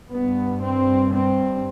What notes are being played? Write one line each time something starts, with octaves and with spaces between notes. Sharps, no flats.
G2 B3
C4
C4